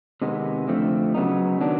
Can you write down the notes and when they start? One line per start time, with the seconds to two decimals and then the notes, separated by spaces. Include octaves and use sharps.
0.22 C3 D#3 G#3 B3
0.68 F2 D3 F3 A3 C4
1.14 C#3 F#3 B3 D#4
1.61 D#3 F#3 B3 D4